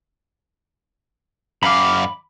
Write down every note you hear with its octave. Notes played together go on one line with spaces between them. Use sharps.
F#2 F5 B5 D6